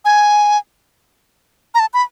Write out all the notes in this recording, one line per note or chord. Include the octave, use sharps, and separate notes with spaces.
G#5
A#5
A5
B5